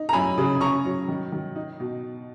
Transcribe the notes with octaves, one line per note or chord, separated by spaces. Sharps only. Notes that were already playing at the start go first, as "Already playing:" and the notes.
Already playing: D#4
A#5
F#2 G#5 B5
C#3
C#4 A#5 C#6
F#3
D#3
D#3
D#4
B2